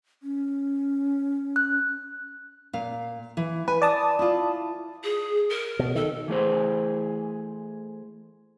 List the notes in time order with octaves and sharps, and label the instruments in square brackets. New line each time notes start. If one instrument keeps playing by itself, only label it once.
[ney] C#4
[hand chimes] F#6
[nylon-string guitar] A#2 F5
E3
[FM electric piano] B4 [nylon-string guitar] G#5
[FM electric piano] D5 A5 D#6
[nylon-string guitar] E4 F4
[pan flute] G#4
A#4
[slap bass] B2
[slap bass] D#3 [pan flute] A4
[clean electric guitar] E3 A3 G#4 C5